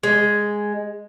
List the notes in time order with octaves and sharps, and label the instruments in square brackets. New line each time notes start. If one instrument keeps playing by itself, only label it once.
[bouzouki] G#3